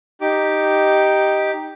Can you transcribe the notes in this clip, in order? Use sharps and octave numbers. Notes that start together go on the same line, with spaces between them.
D#4 G4 D6